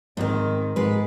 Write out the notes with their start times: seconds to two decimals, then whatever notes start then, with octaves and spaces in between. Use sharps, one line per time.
0.17 G#2 D#3 C4
0.76 G#2 G#3 B4